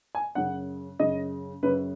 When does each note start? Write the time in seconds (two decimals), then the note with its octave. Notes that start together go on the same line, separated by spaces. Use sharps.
0.15 G#5
0.35 F#2 C#3 F#5
0.99 F#2 C#3 D#5
1.63 F#2 C#3 B4